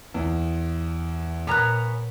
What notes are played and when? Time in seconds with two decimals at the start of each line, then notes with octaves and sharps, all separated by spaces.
0.14 E2
1.47 A#2 B3 C#4 A#5 F#6